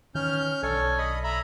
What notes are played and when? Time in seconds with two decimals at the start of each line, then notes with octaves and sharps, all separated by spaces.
0.15 D#3 E3 C#4 F6 G6
0.63 B1 D4 A4 C#5 G#5
0.98 D#5 B5 D#6
1.24 E5 A#5 B5